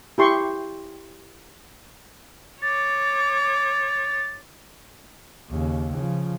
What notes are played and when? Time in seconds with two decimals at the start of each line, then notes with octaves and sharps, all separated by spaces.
0.18 E4 G4 C6 C#6
2.62 C#5 D6 A6
5.50 D#2 C#3
5.95 C#3 F3